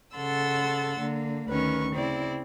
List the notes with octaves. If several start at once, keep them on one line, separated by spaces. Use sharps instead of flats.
C#3 A4 F#5 C6 E6 A6
D3 A#3
D2 D#3 C#4 B4 C#6
C#3 C4 E4 D5